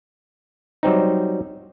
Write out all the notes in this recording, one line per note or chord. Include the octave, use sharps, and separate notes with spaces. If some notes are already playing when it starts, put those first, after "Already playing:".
F#3 G3 C4 D#4